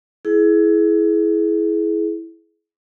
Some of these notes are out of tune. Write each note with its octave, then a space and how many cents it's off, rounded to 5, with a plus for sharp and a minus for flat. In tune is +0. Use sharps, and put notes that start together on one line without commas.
E4 +0 G#4 +25